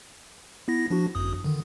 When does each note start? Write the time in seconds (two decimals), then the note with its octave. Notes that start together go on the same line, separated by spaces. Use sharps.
0.68 B3 E4 A#6
0.90 F3 D4 F#4
1.15 G1 F#2 D#6
1.44 D3 D#3